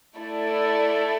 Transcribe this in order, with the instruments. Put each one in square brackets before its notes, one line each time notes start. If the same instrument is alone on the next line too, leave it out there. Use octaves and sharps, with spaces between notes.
[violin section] A3 E4 A4 D5